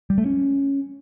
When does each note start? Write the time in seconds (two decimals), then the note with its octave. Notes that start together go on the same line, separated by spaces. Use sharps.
0.10 G3
0.18 A3
0.26 C#4